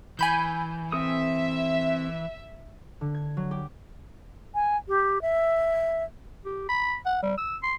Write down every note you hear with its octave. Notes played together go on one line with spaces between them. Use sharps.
E3 G#5 B5 G6
C4 A4 E5 D#6
D3
G#6
F#3
G4
G#5
G4
E5
G4
B5
F#5
G3
E6
C6